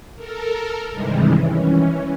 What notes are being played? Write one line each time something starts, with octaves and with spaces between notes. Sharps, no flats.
A4 A#4
G2 C3 D#3 E3 G3 G#3
E3 C#4